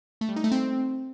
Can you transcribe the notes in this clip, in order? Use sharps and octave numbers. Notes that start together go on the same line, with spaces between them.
A3
G3
D#4
A3
C4